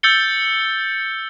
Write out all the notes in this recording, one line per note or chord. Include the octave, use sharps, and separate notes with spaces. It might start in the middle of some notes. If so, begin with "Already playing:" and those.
E6 G6 A6 C#7 G7